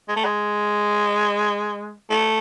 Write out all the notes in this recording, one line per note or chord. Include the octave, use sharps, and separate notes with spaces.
G#3
A3
G#3
A3